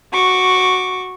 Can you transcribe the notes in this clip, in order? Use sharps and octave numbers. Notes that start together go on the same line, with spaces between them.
F#4 C#6 D6